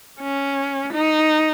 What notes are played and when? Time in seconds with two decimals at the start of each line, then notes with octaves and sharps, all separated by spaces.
0.20 C#4
0.93 D#4